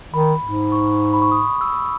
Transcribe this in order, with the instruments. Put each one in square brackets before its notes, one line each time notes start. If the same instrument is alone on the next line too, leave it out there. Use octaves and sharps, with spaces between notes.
[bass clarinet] D#3 [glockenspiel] B5
[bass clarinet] G#2
[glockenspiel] C#6
B5
C#6
D#6
E6